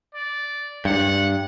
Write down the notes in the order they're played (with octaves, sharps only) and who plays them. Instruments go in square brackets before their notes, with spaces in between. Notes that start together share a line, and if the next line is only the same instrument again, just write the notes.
[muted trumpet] D5
[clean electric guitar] G2 [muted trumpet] F#5